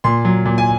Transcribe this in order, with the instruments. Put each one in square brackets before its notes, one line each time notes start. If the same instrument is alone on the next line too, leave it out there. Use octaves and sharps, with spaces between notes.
[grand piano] A#2 C6
F#3
A#2
G#5